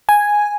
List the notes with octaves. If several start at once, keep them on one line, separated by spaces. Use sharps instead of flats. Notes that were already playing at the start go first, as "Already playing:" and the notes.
G#5